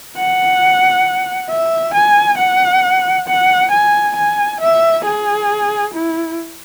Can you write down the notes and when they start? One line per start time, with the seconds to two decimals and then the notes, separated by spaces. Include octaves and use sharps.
0.17 F#5
1.50 E5
1.94 G#5
2.38 F#5
3.28 F#5
3.71 G#5
4.16 G#5
4.61 E5
5.05 G#4
5.94 E4